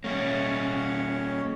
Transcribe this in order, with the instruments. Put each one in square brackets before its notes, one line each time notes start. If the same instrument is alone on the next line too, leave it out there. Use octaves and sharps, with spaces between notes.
[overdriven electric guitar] G3 A#3 [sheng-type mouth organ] C#4 C#5